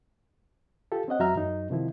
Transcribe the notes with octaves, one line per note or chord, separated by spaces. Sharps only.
F4 G4 A4
C4 C#4 D#5 F#5
F2 F#3 F#4 E5 A#5 F6
F#2 F#3 D#4
C3 D#3 F3 E4